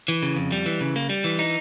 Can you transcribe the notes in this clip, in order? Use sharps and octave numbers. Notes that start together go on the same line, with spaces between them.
E3
C#3
F2
G3
E3
C#3
A#3
G3
E3
D#4